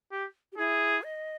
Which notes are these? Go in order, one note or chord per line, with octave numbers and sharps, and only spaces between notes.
G4
G4
E4 G#4
D#5